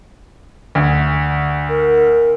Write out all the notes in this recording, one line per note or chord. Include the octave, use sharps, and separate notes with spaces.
D2
A#4